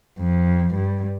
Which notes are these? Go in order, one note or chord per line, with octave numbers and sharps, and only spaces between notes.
F2
G2